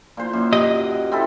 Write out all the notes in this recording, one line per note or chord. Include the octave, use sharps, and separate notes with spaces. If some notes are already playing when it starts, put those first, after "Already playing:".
A#2 C5
F#2
G4 D#5
C4 E4 A4